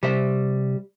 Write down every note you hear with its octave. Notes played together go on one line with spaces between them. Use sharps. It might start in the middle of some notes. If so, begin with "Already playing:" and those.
C3 G3 C5 E5